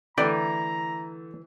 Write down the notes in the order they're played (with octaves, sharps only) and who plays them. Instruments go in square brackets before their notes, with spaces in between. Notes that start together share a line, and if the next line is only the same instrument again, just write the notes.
[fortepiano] D3 A3 [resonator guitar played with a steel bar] E3 [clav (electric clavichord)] B4 D5 G5 [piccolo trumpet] A#5